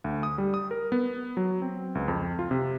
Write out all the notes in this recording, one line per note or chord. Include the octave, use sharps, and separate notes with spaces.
D2
D#6
G3
D#6
A#4
B3
F#3
C4
C#2
F2
F4
C3